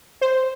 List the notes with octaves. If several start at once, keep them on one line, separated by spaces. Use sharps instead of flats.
C5